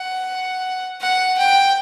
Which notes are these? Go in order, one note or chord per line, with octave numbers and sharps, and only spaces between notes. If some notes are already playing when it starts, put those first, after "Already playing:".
Already playing: F#5
F#5
G5